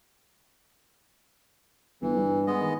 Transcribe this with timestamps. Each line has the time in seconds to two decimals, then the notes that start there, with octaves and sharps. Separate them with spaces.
2.02 G1 E3
2.17 G2
2.47 G#3 B3 D#5
2.61 D#3